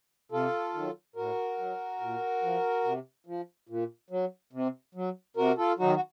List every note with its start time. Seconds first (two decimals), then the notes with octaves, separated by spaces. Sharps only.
0.32 C3 F4 A4
0.74 D#3 F#3
1.16 A2 F#4 A#4
1.58 F#3
2.01 A#2
2.42 F3
2.84 C3
3.27 F3
3.69 A#2
4.10 F#3
4.53 C3
4.95 F#3
5.36 C3 F#4 A#4
5.58 F4 A4
5.79 D#3 F#3 D#4 F#4
5.95 F#4